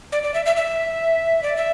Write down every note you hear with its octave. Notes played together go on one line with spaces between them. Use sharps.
D5
D5
E5
E5
E5
D5
E5